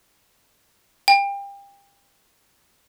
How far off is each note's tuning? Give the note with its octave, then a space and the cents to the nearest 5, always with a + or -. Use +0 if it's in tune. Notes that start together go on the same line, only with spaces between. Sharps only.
G5 +30